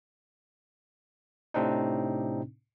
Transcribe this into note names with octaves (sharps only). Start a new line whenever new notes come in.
A2 C3 C4 D4 D#4